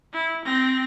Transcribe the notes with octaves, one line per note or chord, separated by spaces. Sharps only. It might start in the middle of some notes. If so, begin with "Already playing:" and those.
E4
C4 A#6